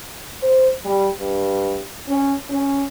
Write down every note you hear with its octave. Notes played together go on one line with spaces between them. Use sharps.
C5
G3
G2
C#4
C#4